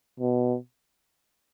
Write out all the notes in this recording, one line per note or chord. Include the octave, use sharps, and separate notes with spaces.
B2